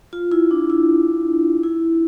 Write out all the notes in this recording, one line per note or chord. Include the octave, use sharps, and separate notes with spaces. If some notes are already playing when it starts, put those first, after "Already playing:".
F4
E4
D4
E4
E4